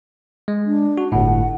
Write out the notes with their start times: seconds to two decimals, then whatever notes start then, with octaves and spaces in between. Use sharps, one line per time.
0.48 G#3
0.66 D4
0.98 F#4
1.12 G1 A2 F#5